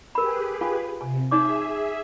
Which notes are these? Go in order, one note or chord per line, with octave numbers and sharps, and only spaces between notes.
G4 G#4 A#4 B4 B5
F4 F5 G#5
C3 G#5
D#4 G#4 C#5 E5 D6